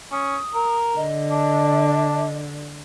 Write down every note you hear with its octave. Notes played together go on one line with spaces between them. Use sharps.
C#4 D#6
A#4
D3 D#5
D4